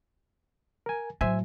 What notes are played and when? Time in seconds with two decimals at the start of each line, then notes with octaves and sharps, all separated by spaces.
0.86 A#4 G#5
1.21 A2 F#3 C5 E5 G#5